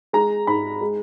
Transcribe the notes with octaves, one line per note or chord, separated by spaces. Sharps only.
G#3 A#5
G#2 B5
G#3